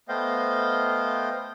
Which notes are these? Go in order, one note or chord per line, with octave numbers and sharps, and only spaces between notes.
A3 B3 C5 D#5 F5 G5